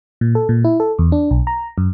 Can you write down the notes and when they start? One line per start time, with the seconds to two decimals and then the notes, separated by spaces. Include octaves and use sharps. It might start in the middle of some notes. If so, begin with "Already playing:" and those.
0.21 A#2
0.35 A4
0.49 A#2
0.64 E4
0.80 A4
0.99 E2
1.12 D4
1.31 B1
1.47 A#5
1.78 F#2